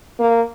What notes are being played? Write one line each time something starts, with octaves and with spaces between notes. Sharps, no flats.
A#3